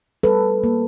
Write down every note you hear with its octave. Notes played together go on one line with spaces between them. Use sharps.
G3 A4 B4
A#3